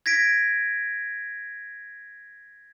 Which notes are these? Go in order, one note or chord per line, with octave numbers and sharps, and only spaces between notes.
G#6 A#6 B6 D7